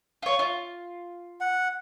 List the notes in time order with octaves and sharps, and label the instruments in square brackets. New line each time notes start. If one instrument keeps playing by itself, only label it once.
[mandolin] F4 C#5
F4
[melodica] F#5